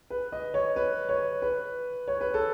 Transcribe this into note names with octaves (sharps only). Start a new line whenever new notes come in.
B4
D#5
C#5
B4
C#5
B4
C#5
B4
A4